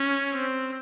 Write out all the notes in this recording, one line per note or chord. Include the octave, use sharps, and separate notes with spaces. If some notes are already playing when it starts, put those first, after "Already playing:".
Already playing: C#4
C4